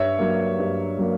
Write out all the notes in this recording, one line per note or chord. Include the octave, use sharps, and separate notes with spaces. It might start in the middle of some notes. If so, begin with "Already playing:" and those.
Already playing: G2 C#5 E5
F#3 A#3
G2
F#3 A#3